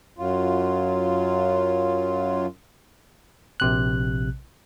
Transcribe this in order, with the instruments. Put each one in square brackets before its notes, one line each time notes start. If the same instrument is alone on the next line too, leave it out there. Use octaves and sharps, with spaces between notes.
[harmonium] F#2 F#3 F4
[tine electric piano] A#1 C3 F#6